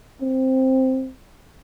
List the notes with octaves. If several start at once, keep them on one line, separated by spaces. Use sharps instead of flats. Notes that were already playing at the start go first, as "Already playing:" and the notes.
C4